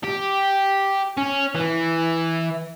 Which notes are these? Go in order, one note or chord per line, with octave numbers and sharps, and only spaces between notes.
G4
C#4
E3